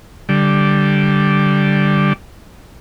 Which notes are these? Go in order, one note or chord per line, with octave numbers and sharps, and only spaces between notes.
D3 G3